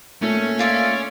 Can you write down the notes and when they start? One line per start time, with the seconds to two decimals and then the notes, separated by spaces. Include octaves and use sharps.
0.22 A#2 A3 C#4
0.59 F4 D5 E5